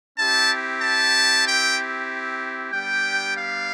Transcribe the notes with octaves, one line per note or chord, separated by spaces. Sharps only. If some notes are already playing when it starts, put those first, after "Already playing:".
C4 E4 G4 A5
A5
G5
G3 B3 D4 G4 G5
F5